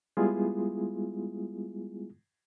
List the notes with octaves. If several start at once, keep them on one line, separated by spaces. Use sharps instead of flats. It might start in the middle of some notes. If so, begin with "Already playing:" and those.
G3 G#3 B3 E4 F4 G#4